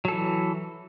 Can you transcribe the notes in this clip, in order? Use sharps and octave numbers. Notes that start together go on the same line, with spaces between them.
E3 F#3 A4